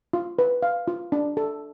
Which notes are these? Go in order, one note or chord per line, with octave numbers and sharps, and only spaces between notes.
F4
B4
F5
F4
D4
A4